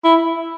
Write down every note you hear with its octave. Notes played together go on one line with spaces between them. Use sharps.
E4